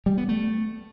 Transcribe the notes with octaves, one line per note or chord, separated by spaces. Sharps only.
G3
B3
A3